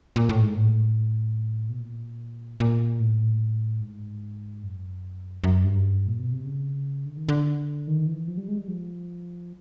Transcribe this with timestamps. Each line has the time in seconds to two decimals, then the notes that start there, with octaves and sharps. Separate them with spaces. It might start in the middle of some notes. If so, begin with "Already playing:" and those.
0.16 A#2
0.29 A2
0.43 G#2
0.55 A2
1.69 B2
1.79 A#2
2.60 A#2
3.00 A2
3.81 G#2
4.63 F#2
5.44 F#2
5.64 G2
6.07 A#2
6.20 B2
6.32 C3
6.45 C#3
7.06 D3
7.17 D#3
7.29 D3
7.87 D#3
8.07 E3
8.28 F3
8.37 G3
8.48 G#3
8.58 G3
8.68 F3